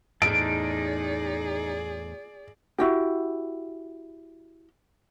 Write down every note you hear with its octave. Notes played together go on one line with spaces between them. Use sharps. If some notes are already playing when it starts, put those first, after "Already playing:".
E2 A2 D#4 G#4 D5 A5 D7
E4 F#4 G4